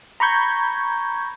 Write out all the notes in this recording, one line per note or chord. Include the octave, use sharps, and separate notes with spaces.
A#5 B5 C#6 G6 G#6